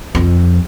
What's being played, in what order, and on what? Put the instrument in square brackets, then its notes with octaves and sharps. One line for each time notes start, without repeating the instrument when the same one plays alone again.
[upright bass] F2